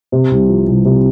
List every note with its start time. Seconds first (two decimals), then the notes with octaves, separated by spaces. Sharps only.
0.12 C3
0.31 C2
0.49 F3
0.68 C2
0.85 C3